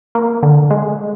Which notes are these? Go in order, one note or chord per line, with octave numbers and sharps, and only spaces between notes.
A#3
D3
G#3